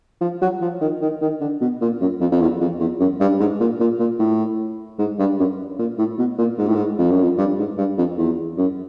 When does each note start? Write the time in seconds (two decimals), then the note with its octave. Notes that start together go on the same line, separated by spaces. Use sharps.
0.21 F3
0.41 F#3
0.61 F3
0.81 D#3
1.01 D#3
1.21 D#3
1.40 D3
1.61 B2
1.81 A#2
2.01 F#2
2.20 F2
2.31 F2
2.41 E2
2.60 F2
2.80 E2
3.00 F#2
3.20 G2
3.40 G#2
3.60 A#2
3.80 A#2
4.00 A#2
4.19 A2
4.99 G#2
5.19 G2
5.39 F#2
5.79 A#2
5.98 A2
6.19 B2
6.38 A#2
6.58 G#2
6.67 A2
6.75 G#2
6.99 F2
7.10 F#2
7.23 F2
7.38 G2
7.58 G#2
7.78 G2
7.98 F2
8.18 E2
8.57 F#2